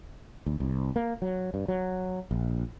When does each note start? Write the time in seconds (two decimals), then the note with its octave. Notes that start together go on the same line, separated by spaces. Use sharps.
0.46 D2
0.60 C2
0.96 A#3
1.22 F#3
1.54 G2
1.68 F#3
2.31 A#1